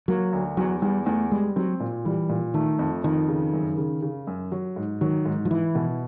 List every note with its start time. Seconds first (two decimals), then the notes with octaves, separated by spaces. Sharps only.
0.08 F#3 A#3
0.33 D2
0.57 E2 F#3
0.82 E2 G3
1.06 E2 A3
1.31 G3 G#3
1.56 F#3 C4
1.80 A#2
2.05 E3 G3
2.29 A#2
2.54 D#3 A3
2.79 F2
3.04 F2 D#3
3.28 C#3
3.53 F#2
3.77 C#3
4.02 C#3
4.27 F#2
4.52 F#3
4.76 G#2
5.01 D#3 F#3
5.25 G#2
5.45 F3
5.50 E3 E4
5.75 B2